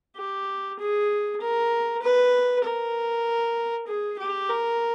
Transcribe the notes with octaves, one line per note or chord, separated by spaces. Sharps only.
G4
G#4
A#4
B4
A#4
G#4
G4
A#4